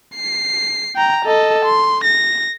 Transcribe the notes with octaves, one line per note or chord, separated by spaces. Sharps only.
C7
G5 A#5
A4 D#5
C6
A#6